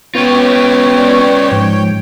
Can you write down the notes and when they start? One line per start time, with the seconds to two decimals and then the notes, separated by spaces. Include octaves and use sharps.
0.15 B3 C#4 F4 C#5 G5
0.98 B4 D5 C#6
1.52 G#2 F3 G#3